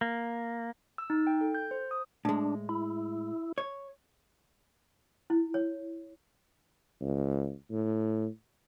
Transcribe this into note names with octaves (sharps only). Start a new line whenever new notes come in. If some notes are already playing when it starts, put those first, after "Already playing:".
A#3
E6
D#4
G5
A4
G6
C5
D#6
A2 G#3 D4
E4
C#5
E4
C#5
C#2
A2